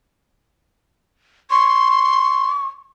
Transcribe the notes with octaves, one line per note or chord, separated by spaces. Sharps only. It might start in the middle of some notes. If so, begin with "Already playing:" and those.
C6 C#6